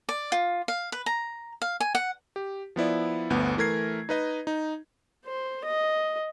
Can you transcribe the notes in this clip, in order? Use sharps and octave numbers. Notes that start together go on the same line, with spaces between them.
D5
F4
F5
B4
A#5
F5
G#5
F#5
G4
F3 B3 E4 D5
G1 D2 B3
E3 A3 A#4 G#6 C7
D#4 B4 D#5
D#4
C5
D#5